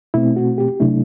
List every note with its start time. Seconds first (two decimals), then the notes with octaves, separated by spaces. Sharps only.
0.14 B2 A3 C4 E4
0.36 F#4
0.58 G4
0.80 C3 F#3 A3 D4 E4